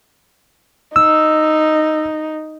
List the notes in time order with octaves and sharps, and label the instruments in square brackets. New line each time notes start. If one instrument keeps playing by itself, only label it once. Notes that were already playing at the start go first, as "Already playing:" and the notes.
[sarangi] D#4 [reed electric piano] E6